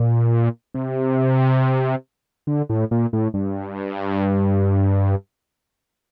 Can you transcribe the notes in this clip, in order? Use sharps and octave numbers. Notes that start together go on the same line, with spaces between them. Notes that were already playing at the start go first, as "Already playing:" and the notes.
Already playing: A#2
C3
D3
A2
A#2
A2
G2